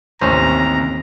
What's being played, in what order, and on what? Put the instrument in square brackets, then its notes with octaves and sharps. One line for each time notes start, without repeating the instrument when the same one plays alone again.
[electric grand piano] A1 A2 [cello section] D#2 C3 [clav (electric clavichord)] C#4 C5 [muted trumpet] A#5